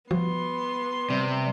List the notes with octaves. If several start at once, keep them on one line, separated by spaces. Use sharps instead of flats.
F3 G3 B3 F#4 C6
C3 G3